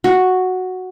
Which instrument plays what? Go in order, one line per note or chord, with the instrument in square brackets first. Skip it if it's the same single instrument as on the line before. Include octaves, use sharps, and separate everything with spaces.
[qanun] F#4